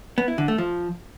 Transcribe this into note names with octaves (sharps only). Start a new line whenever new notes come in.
B3
E4
D3
A3
F3